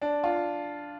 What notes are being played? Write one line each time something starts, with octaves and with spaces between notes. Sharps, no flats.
D4
F4